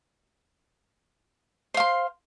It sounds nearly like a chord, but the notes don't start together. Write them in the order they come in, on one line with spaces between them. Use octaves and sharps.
C5 F5 C6